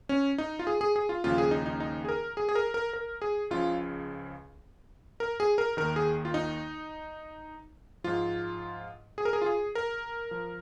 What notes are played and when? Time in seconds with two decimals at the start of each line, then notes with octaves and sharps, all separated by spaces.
0.09 C#4
0.38 D#4
0.59 F4
0.67 G#4
0.81 G#4
0.96 G#4
1.09 F4
1.24 D#2 C#3 F3 F4
1.38 G#4
1.51 D#4
1.66 D#4
1.80 D#4
2.05 G#4
2.09 A#4
2.37 G#4
2.49 G#4
2.55 A#4
2.74 A#4
2.93 A#4
3.22 G#4
3.50 C#2 C#3 F3 F4
5.20 A#4
5.40 G#4
5.58 A#4
5.77 D#2 D#3 A#4
5.96 G#4
6.25 F4
6.34 D#4
8.04 G#2 F3 F4
9.18 G#4
9.25 A#4
9.33 G#4
9.42 F4
9.46 G#4
9.75 A#4
10.31 F3